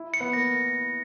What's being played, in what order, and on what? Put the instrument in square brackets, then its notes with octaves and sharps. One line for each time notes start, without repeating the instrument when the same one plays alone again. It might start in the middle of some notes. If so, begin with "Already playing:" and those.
Already playing: [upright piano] E4
[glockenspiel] C#7
[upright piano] B3
[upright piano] A#3 [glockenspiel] A#6